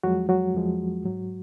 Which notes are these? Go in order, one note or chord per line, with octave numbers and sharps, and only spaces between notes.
F2 F3 F#3 G#3 F#4
F#3 F#4
F2 F3 G#3
G#2 F#3